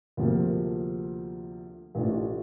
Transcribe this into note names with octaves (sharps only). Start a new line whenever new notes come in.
D2 C3 F3 A#3
A1 A2 A3 D4 F4